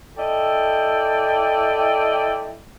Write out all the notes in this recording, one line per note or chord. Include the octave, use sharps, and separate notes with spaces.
E4 A4 D5 D#5 G5